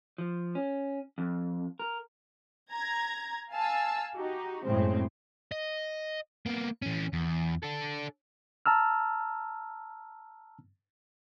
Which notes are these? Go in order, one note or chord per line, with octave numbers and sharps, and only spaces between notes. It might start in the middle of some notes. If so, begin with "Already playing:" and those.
F3
C#4
F2
A#4
A#5 G#6
F5 G#5 A5 E6
D#4 F#4 G4
F#2 A2 C#3 G#3 C4
D#5
A#3 B3
E3 C#4
E2
D4 A4
A5 A#5 E6 F6